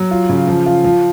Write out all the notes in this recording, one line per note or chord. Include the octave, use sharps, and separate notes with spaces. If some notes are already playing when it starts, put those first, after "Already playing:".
Already playing: F#3
F4
C#3
F3
F4
F3